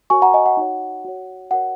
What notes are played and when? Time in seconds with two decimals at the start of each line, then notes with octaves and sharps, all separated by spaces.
0.10 F#4 A#4 C#5 G#5 C#6
0.22 F#5 A#5
0.34 D#5 G#5
0.46 F#5
0.57 D#4 F#4 C#5
1.05 F#4 C#5
1.51 F#4 A#4 C#5 F#5